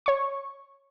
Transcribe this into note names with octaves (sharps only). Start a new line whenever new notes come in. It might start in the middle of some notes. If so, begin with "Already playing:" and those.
C#5 C#6